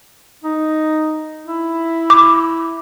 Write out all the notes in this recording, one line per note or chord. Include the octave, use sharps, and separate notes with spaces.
D#4
E4
D6